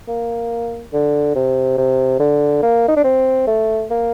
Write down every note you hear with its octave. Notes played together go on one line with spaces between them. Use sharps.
A#3
D3
C3
C3
D3
A#3
D#4
D4
C4
A3
A#3